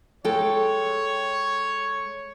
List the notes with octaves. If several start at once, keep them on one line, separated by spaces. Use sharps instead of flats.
G#3 A4 C#5 G5